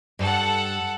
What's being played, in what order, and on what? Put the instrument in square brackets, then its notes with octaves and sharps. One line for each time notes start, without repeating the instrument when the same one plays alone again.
[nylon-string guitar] G2 [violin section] A4 F#5